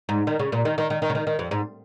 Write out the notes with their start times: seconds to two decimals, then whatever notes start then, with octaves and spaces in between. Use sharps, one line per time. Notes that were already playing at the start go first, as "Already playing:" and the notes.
0.09 G#2
0.27 D#3
0.39 C#3
0.52 A#2
0.65 D#3
0.78 D#3
0.90 D#3
1.02 D#3
1.10 C#3
1.15 D#3
1.27 D#3
1.39 F2
1.51 G#2